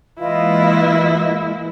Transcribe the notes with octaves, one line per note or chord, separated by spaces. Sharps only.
E3 G#3 A#3 E4 F4 B4 D#5